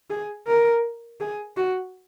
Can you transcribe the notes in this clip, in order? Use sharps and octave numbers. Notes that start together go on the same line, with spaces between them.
G#4
A#4
G#4
F#4